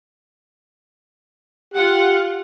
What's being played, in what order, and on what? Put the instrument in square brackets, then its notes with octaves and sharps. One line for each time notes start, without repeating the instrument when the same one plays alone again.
[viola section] F4 F#5 [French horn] G4